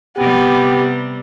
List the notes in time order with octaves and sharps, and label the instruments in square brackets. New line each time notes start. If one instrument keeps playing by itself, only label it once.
[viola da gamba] C3 G3 [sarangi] B3 [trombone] G4